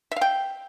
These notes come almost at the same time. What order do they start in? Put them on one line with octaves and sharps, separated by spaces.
E5 F5 G5